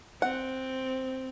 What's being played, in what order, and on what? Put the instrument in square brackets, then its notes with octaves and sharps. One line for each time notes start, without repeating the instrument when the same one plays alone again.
[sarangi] C4 [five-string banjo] F#5